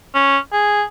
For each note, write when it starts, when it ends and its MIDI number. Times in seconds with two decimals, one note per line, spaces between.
0.15 0.38 61
0.53 0.83 68